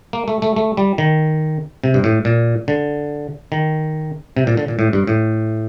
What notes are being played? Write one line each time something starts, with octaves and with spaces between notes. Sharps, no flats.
A#3
A3
A3
A3
G3
D#3
C3
G2
A2
A#2
D3
D#3
C3
A#2
D3
A#2
A2
G2
A2